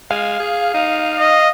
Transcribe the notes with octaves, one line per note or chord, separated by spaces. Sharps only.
G#3 F5
G#4
D#4
D#5